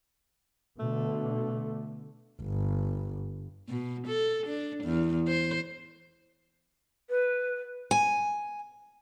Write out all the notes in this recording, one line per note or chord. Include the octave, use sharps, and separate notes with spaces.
B2 D3 A3
G1
B2
A4
D4
E2
C5
B4
G#5